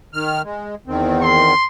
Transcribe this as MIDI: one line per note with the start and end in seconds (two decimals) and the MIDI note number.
0.13 0.42 51
0.13 0.42 89
0.44 0.75 56
0.87 1.54 40
0.87 1.54 51
0.87 1.54 60
1.22 1.65 84